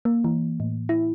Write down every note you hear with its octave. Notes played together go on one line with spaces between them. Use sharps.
A#3
E3
A2
E4